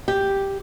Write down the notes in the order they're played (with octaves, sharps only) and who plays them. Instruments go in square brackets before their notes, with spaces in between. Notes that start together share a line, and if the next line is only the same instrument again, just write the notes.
[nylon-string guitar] G4